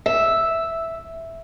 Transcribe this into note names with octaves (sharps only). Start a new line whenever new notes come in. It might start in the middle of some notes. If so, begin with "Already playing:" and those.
E5